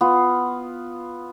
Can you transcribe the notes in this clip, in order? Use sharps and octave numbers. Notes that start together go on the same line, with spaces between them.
B3 F4